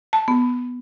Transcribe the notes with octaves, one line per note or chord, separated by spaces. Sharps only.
A5
B3